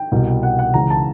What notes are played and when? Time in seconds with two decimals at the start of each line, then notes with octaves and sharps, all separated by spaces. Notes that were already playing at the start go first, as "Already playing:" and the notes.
Already playing: G5
0.12 C2 B2
0.43 F#5
0.59 F#5
0.74 C#2 C#3 E3 A#5
0.90 A5